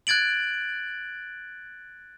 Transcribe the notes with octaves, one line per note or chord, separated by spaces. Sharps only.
F#6 G#6 A6 D7 F#7